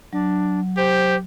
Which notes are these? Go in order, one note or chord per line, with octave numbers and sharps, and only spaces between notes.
F#3 D4
G4 C5